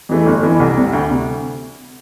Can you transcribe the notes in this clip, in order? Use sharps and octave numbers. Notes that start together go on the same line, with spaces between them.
F2 E3 A3
G1
F2 E3
C2
C3 G3
D2
C3